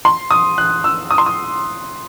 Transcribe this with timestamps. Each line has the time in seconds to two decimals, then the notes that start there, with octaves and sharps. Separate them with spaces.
0.05 C6
0.31 D#6
0.58 F#6
0.84 E6
1.11 D#6
1.18 C6
1.26 D#6